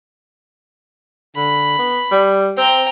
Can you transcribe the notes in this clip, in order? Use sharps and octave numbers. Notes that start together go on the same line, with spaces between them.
D3 B5
B3
G3
C4 G5 A#5